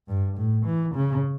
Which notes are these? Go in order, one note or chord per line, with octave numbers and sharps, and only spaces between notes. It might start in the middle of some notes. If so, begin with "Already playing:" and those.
G2
A2
E3
C#3